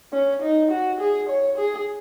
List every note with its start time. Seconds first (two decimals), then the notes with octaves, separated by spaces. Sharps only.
0.13 C#4
0.42 D#4
0.71 F#4
1.00 G#4
1.29 C#5
1.58 G#4